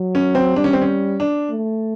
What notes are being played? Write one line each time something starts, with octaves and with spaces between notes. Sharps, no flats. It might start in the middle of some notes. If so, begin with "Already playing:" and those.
Already playing: F#3
C#4
C4
G3 D4
C#4
C4
C#4
D4
A3